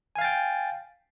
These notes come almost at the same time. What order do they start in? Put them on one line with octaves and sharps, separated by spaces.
G#5 F5 A6 G5